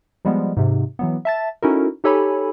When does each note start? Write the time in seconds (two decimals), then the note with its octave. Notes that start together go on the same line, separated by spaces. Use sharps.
0.25 F3 G3 G#3 B3
0.57 G#2 C3
0.99 E3 F#3 B3
1.25 E5 A5 A6
1.63 C#4 D#4 E4 F#4 A4 A#4
2.04 D#4 G4 A4 C#5 G#5 B5